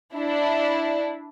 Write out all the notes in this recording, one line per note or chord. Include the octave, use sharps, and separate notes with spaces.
D4 E4